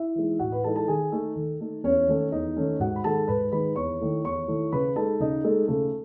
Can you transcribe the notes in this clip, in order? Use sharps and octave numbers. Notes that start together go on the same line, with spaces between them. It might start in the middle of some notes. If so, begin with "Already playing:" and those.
Already playing: E4 E5
E3 G#3 D#4
A2 F#4 F#5
B4 B5
E3 G#3 D#4 A4 A5
A4 A5
D#3 G#4 G#5
A3 D#4 A4
D#3
A3 D#4
E2 C#4 C#5
D#3 A3 C#4
E2 D#4 D#5
D#3 A3 C#4
G#2 F#4 F#5
B5
D#3 G#3 D#4 A4 A5
G#2 B4 B5
D#3 G#3 D#4 B4 B5
E2 C#5 C#6
D#3 A3 E4
E2 C#5 C#6
D#3 A3 E4
C#3 B4 B5
G#3 D#4 A4 A5
C#3 D#4 D#5
G#3 A3 D#4 A4
C#3 A3 A4